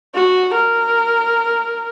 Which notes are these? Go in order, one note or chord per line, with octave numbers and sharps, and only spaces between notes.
F#4
A#4